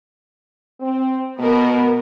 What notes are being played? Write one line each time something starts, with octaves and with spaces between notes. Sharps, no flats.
C4
B2 B3 A#4